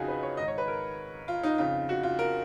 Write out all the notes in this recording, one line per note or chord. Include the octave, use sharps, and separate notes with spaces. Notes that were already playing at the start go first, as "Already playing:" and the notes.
Already playing: F2 C#3 D#4 F4 F#4 G#4
B4
C#5
G#2 D#3 D#5
C#5
B4
A#4
F4
D#4
F2 C#3 F4
F#4
F4
A#4